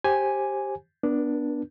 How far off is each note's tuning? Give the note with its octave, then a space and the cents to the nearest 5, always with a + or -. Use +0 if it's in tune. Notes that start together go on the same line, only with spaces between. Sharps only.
G4 +0 C5 +25 G#5 +0
B3 +0 D4 +0 B4 -45